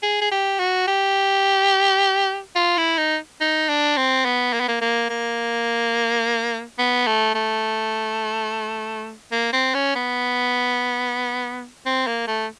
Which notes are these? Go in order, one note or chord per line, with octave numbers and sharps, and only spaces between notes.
G#4
G#4
G4
F#4
G4
F4
E4
D#4
D#4
D4
C4
B3
A#3
B3
A#3
A#3
A#3
B3
A3
A3
A#3
C4
C#4
B3
C4
A#3
A3